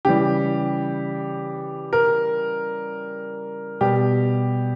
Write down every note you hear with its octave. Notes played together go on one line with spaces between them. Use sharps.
C#3 E3 G3 G4
A#4
B2 G3 G4